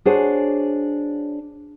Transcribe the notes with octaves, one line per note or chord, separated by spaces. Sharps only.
D4 F#4 G#4 C5 C#5